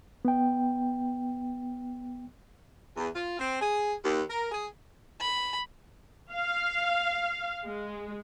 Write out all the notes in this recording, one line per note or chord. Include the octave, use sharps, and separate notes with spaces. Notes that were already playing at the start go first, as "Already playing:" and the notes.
B3 G5
E2
F4
C4
G#4
D#2
A#4
G#4
B5
F5
G#3